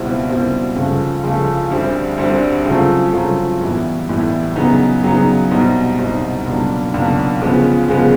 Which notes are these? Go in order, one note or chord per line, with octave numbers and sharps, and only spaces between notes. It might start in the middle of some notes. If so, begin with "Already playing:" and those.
Already playing: C#2 B2 G3 C4 E4
C#2 B2 G3 C4 E4
C#2 C#3 F3 A3
C#2 C#3 F3 A3
D2 D3 G3 C4
D2 D3 G3 C4
C#3 F#3 A3 C4 F4
C#3 F#3 A3 C4 F4
A2 E3 G3 B3 E4
A2 E3 G3 B3 E4
C#3 F#3 B3 D#4
C#3 F#3 B3 D#4
C2 B2 G3 C4 D#4
C2 B2 G3 C4 D#4
C#2 B2 F#3 A#3 D4
C#2 B2 F#3 A#3 D4
C#3 F3 G#3 B3
C#3 F3 G#3 B3